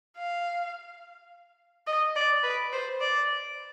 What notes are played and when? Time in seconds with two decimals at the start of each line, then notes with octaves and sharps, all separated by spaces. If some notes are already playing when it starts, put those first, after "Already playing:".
0.18 F5
1.87 D#5
2.16 D5
2.43 B4
2.73 C5
3.01 D5